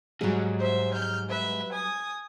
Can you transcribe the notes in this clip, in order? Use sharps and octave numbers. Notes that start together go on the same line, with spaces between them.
E2 G#2 F#3 G3 G#4
C5 E5
F6 G6
B4 E5
G#5 D#6